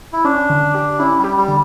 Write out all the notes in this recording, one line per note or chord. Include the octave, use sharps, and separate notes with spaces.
E4
C#4 D4
D3
G4
C#4 E4
G3
G4
G3
D3